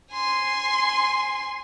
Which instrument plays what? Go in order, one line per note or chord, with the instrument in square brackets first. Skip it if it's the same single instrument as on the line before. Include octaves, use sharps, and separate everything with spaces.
[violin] G#5 C6